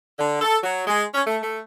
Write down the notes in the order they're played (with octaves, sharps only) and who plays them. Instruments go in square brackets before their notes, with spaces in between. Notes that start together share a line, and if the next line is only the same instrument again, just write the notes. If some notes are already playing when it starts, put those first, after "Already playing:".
[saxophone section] D3
A4
F#3
G#3
C#4
A3
A3